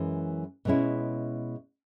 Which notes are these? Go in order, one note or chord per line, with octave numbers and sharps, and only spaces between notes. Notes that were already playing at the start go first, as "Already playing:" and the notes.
Already playing: F#2 E3 G#3
B2 G#3 C#4 E4